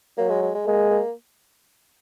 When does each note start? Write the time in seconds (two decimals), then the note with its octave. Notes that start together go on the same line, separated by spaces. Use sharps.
0.18 F#3 A#3
0.29 G#3
0.42 G#3
0.55 G#3
0.66 G#3 A#3
0.90 A#3